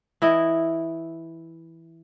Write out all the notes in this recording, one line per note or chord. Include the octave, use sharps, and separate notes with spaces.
E3 E4 D#5